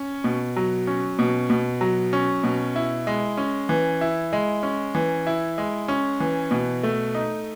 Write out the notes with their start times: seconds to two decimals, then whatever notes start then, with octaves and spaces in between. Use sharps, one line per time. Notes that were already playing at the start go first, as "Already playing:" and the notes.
Already playing: C#4
0.24 B2
0.56 F#3
0.87 C#4
1.19 B2
1.50 B2
1.81 F#3
2.13 C#4
2.44 B2
2.76 E4
3.07 G#3
3.37 C#4
3.69 E3
4.01 E4
4.33 G#3
4.63 C#4
4.95 E3
5.27 E4
5.58 G#3
5.88 C#4
6.20 E3
6.51 B2
6.83 A3
7.15 D#4